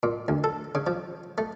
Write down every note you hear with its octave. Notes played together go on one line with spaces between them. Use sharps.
A#2
D2
A4
C#3
F3
A3